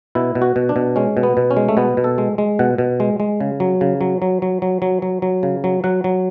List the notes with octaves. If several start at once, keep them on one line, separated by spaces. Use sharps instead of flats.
B2 E4
B2
F#4
B2
D4
B2
G#3 C#4
B2
B3
B2
C#4
G#3
A3
B2 B3
B2
A4
G#3
G#3
B2 F#5
B2
G#3
G#3
C#3
F#3
C#3
F#3
F#3
F#3
F#3
F#3
F#3
F#3
C#3
F#3
F#3 F#5
F#3